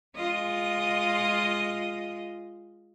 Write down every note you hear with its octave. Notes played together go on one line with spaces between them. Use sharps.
G#3 F4 D#5